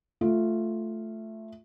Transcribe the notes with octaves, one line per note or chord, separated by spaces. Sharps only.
A3 F4